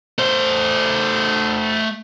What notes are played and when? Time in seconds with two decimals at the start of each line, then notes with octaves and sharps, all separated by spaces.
0.18 A3 C5